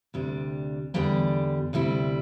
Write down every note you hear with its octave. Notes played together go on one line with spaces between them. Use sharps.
D2 C3 G3 D4
E2 D3 G3 D4 G4
D2 C3 G3 E4